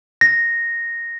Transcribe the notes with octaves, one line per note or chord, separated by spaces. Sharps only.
A#6